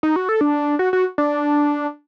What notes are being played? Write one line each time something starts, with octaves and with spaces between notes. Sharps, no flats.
D#4
F#4
A4
D4
F#4
F#4
D4